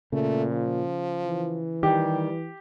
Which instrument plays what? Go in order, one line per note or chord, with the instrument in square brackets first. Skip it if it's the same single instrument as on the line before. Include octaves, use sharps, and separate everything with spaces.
[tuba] A#2 [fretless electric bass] C#3 [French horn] A3
[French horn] F3
[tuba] E3
[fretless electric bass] D#3 [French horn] G3 [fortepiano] G4